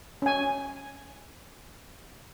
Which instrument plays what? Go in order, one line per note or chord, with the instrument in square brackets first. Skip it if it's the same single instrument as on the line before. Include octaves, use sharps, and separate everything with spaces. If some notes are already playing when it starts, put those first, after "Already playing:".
[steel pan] C#4 G#5